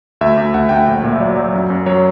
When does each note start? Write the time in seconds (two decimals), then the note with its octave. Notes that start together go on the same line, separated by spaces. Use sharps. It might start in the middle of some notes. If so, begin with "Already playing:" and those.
0.21 D2 E5
0.37 D2
0.54 D2 F#5
0.69 D2 G5
0.76 F#5
0.88 A#1
1.04 A#2
1.12 E5
1.20 F#3 D5
1.37 F#3
1.54 F#2
1.70 F#2
1.86 F#3 C#5